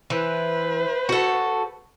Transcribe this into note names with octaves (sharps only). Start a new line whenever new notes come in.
E3 B4 C5
F#4 A4